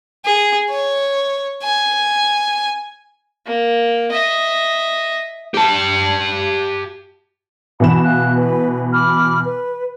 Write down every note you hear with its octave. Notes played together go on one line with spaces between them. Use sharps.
G#4
C#5
G#5
A#3
D#5 E5
G4 A5
B2 E3 E5 B5 E7
F5 F#6
B4
B5 D6 F6
B4